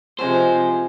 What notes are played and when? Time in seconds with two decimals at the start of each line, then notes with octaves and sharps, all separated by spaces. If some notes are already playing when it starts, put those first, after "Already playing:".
0.19 C3 F3 G#3 C5